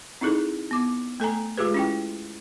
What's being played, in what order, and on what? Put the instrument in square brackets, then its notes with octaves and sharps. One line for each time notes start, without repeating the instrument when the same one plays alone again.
[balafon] C4 D#4 E4 G#4 A4
B3 D6
A3 A4 G#5 A#5
G#3 F4 G4 G#4 B4
C#4 E4 G5